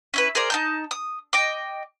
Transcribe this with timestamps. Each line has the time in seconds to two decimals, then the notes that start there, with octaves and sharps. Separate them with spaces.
0.14 C#4 E4 B4
0.35 G#4 A#4 C5 D5
0.50 D#4 A5 G6
0.91 D#6
1.33 D#5 G5 D6